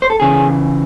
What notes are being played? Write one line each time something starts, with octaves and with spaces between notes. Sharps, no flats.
C5
A4
C#3 E3 G#4